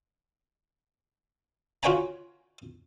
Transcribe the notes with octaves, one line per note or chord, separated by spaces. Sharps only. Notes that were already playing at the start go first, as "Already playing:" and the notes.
F4 F#4 C#5 G5 G#5 A#5